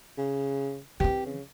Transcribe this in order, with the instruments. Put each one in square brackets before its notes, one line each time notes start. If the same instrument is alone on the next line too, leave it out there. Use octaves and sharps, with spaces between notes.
[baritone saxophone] C#3
[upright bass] E3 C4 [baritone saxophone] G4
[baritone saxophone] C#3